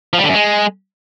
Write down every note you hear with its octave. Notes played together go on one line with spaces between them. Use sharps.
F3
G3
D3
F#2
G#3